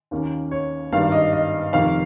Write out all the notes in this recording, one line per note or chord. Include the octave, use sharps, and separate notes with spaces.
D#2 D#3 A#3 C#4
C#5
G#1 G2 D#3 G3 A#3 F5
D#5
D#5
F1 F2 D#3 F5